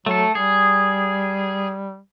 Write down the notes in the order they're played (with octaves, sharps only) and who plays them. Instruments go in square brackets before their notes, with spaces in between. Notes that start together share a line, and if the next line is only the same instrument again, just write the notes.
[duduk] F#3 [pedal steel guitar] A3 A4
[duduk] G3 [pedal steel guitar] G#4